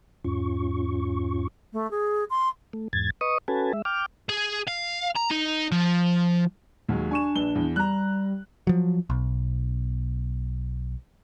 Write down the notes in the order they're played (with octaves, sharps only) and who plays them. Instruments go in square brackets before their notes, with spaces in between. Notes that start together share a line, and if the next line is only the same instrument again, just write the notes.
[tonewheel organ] E2 G#2 C#4 F4 C#6
[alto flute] A3
G#4
C6
[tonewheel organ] A3
E2 G#2 G#6 A6
B4 D#5 C#6 D#6
C#4 F#4 A4 B4 G#5 A5
G#3 E5
G5 D6 F6
[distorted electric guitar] G#4
F5
A#5
D#4
F3
[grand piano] D#2 F#3 G#3
[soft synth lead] D4 [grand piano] G#5 C#6 E7
[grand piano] A#1 B4 G7
E2
[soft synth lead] G3 [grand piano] A#5 F#6
[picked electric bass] F3 F#3
B1